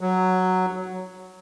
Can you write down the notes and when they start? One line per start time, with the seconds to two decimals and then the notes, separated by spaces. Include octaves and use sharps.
0.01 F#3